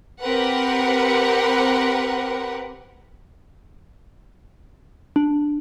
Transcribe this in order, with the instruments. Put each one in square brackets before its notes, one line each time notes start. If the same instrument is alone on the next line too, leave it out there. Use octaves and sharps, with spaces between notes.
[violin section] C4 G4 A#4 B4 F#5
[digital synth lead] D4